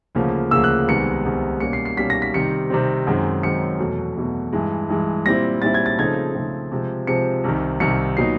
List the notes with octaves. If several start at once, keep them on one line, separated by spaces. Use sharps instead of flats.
D2 C#3 F3 A#3
D2 C#3 F3 A#3 E6
F#6
C2 C3 D#3 G#3 B3 C#7
C2 C3 D#3 G#3 B3
B2 G3 A#3 C#4 C#7
C7
C7
B2 G3 A#3 C#4 B6
A#6
B6
C3 D#3 G3 C4 C#7
C3 D#3 G3 C4
F#2 D#3 G#3 C4
F#2 D#3 G#3 C4 C#7
E2 B2 F#3 A3
E2 B2 F#3 A3
G2 E3 G#3
G2 E3 G#3
A#2 G3 C4 E4 A#6
A#2 G3 C4 E4 A6
G#6
A6
C#3 F3 A3 C4 D#4 G#6
C#3 F3 A3 C4 D#4
C3 F3 G#3 C4
C3 F3 G#3 C4 C#7
C2 C3 D#3
C2 C3 D#3 C#7
A#2 F#3 B3 D#4 C7